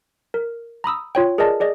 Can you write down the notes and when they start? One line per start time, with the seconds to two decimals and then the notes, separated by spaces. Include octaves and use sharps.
0.34 A#4
0.84 A#5 B5 D#6 E6
1.15 F4 C#5 G5
1.38 G#4 A#4 B4 D5 D#5 A5
1.60 G#4 D5 D#5